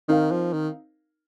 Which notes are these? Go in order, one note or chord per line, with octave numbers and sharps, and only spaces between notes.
D#3 C4 D#4 A#4 F5
F3
D#3